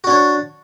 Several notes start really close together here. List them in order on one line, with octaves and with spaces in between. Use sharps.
F#4 D4 C#5